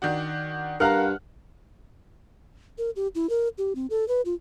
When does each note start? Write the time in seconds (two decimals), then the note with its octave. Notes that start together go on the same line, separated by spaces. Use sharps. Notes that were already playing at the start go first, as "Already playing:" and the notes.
0.02 D#3 D4 F#4
0.80 G2 A#4 F5 F#5 A#5 F6 F#6
2.78 A#4
2.96 G4
3.15 E4
3.29 A#4
3.58 G4
3.75 C4
3.90 A4
4.08 B4
4.25 F4